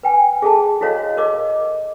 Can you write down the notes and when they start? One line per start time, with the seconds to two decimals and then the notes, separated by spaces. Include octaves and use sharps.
0.03 B4 G5 G#5
0.42 G#4 A4 A5
0.81 E4 F#4 A4 C#5 D#5 F5
1.17 A#4 D#5 D6